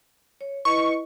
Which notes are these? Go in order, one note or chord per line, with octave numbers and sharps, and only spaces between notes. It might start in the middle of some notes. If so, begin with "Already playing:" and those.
C#5
E4 B4 D#5 C#6